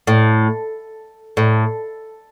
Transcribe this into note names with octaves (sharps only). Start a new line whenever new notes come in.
A2
A2